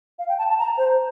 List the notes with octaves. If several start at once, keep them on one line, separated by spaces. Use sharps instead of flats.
F5
G5
A5
A5
A#5
C5